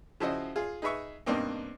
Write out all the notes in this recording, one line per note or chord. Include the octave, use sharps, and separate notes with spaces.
C#3 F3 E4 F#4 D#5
F4 G#4
D#4 G#4 B4 E5 C#6
G2 B2 A#3 C4 D4 D#4